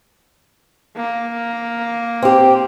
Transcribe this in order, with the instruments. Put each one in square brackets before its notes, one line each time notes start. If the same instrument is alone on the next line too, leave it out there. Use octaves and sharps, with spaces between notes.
[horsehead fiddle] A#3
[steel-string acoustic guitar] C4 G4